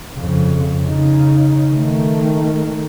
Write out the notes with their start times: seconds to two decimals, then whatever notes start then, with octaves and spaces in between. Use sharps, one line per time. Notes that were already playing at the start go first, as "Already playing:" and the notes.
0.14 F2 C#3
0.84 C#3 D#4
1.71 D#3 A3